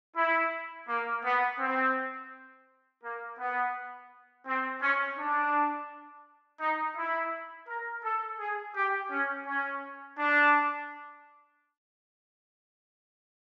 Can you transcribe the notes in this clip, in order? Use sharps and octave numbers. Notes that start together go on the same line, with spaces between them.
E4
A#3
B3
C4
A#3
B3
C4
C#4
D4
D#4
E4
A#4
A4
G#4
G4
C#4
C#4
D4